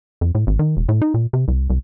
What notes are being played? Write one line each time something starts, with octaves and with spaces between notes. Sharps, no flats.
F2
A2
G#1
D#3
E1
A2
D#4
A#2
C3
C2
C2